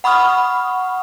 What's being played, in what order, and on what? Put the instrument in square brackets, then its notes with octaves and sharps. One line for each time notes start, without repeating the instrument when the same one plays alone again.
[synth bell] F#5 B5 C#6 D#6 F6